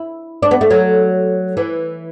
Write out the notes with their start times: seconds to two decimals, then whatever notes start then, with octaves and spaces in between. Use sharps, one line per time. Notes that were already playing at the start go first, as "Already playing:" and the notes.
Already playing: E4
0.42 D4
0.51 B3
0.61 A3
0.70 F#3
1.57 E3